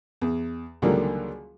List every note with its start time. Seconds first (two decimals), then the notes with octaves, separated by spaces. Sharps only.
0.22 E2
0.82 C#2 D3 D#3 F#3 G3 A#3